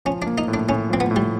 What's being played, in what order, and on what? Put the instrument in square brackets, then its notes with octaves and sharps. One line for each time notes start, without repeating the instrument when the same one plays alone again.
[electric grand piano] F3 [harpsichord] C#4
[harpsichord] D4
[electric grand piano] A#3
[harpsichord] D#4
[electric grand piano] A2
[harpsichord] D4
[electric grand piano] A2 [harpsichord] C#4
[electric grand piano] F3 [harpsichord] C4
[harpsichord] B3
[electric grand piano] A2
[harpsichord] G3